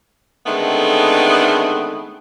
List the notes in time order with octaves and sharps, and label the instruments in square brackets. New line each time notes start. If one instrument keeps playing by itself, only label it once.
[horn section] D3 D#3 G#3 A3 B3 C4